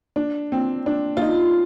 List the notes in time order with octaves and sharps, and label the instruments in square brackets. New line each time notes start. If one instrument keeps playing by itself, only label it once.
[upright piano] D4
C4
D4
F4
D#4